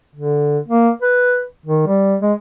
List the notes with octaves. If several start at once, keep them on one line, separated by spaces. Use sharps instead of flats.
D3
A#3
B4
D#3
G3
G#3